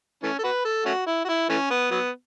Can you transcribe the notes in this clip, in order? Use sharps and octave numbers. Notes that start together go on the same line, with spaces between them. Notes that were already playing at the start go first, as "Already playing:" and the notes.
E3 A3 C#4
A4
F#4 B4
A4
A3 C#4 F#4
E4
F#4
E4
E3 A3 C#4
B3
F#3 B3